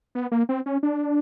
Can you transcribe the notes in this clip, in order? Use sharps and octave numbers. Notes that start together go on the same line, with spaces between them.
B3
A#3
C4
C#4
D4